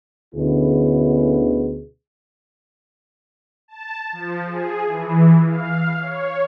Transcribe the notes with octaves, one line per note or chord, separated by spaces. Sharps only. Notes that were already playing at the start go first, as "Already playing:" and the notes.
D2 B2 D3 C#4 E4 G#4
A5
F3
G#4
E3
F5
C#5